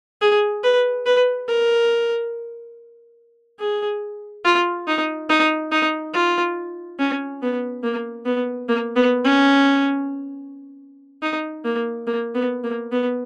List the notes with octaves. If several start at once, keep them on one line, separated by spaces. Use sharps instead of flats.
G#4
B4
B4
A#4
G#4
F4
D#4
D#4
D#4
F4
C#4
B3
A#3
B3
A#3
B3
C#4
D#4
A#3
A#3
B3
A#3
B3